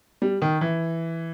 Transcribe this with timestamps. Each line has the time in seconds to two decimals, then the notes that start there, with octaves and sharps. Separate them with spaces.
0.22 G3
0.42 D#3
0.61 E3